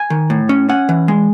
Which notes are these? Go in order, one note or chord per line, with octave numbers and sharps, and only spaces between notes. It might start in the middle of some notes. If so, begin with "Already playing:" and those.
Already playing: G#5
D#3
A2
C#4
C#4 F#5
E3
G#3